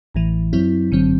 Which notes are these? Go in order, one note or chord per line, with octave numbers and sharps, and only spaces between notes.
A1 A2 E3
F#2 F#3 C4 E4
G1 F#2 D3 F#3 C4